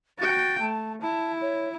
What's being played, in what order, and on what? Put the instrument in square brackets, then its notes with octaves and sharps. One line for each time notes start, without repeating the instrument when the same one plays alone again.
[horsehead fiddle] F#4 G5 [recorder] A6
[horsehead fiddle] A3 [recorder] A5
[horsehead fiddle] E4 [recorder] A5
[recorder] C#5